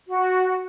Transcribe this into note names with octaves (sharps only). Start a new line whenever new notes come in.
F#4